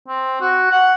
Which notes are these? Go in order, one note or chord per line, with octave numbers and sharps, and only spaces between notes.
C4
F#4
F#5